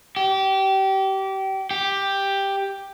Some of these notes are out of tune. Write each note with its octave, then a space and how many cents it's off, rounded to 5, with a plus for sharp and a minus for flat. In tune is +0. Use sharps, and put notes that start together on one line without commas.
G4 -25
G4 +5